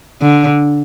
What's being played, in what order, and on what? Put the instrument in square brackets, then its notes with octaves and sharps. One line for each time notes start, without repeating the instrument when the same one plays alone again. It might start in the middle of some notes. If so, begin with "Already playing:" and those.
[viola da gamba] D3